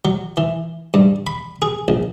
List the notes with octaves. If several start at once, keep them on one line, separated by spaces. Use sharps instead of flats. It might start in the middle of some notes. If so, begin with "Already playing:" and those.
F#3
E3
G2
B5
G#4
A#1